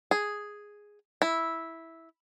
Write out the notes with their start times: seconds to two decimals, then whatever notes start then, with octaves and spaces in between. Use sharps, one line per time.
0.11 G#4
1.22 E4